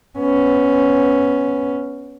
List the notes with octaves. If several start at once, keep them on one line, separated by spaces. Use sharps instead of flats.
B3 C#4